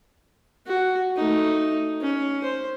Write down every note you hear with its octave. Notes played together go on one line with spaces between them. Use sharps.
F#4
A3 D#4
C#4
C5